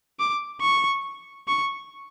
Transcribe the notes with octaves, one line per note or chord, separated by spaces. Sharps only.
D6
C#6
C#6